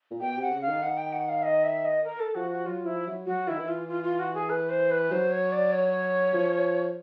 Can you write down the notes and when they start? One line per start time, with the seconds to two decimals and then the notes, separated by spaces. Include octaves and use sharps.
0.11 A#2
0.21 B2 G5
0.37 C3
0.42 F#5
0.51 C#3
0.61 F5
0.68 D#3
0.82 D#3 F#5
0.98 G5
1.13 F#5
1.29 F5
1.43 D#5
1.64 E5
1.85 D#5
2.04 A#4
2.20 A4
2.35 F3 F#4
2.51 F#4
2.66 F#3 F4
2.86 F3 E4
3.07 F#3
3.27 F#3 F#4
3.48 D#3 E4
3.58 E3
3.68 F4
3.88 F4
4.03 F4
4.20 F#4
4.35 G#4
4.49 B4
4.70 C5
4.91 B4
5.11 F#3 C5
5.31 C#5
5.52 D5
5.72 C#5
6.34 F3